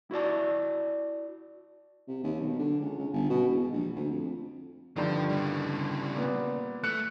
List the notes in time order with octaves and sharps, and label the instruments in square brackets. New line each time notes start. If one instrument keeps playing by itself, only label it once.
[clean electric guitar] E4 F#4 D5 A5
[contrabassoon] C3
D#2
B1
D3
C#2
C#2
G1
B2
E1
A#1
D2
F2
[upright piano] G2 D3 D#3 [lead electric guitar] F3
[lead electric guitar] C#3 G3
[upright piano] A#2 B3
[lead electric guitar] A3 [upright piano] F#6 C#7